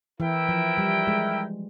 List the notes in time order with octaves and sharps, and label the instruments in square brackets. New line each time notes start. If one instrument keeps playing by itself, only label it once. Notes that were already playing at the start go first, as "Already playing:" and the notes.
[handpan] E3 [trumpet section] E4 A#4 E5 G5
[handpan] F3
G3
G#3